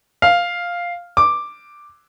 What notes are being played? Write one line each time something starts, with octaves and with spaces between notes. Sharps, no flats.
F5
D6